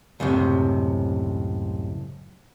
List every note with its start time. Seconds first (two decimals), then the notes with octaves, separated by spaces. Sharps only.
0.20 C#2 F#2 A2 C3